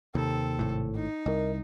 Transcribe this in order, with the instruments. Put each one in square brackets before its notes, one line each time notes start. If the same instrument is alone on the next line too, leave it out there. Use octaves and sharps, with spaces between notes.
[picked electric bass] D#2 [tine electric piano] C3 [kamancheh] C4 A4
[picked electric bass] G#1 A2
[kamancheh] D#4
[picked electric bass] C2 [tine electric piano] A#4 D#5